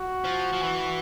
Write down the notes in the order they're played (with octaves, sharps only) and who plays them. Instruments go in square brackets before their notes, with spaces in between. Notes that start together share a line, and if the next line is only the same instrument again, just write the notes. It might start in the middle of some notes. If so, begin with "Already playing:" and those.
Already playing: [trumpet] F#4
[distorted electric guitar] F3
F3
E3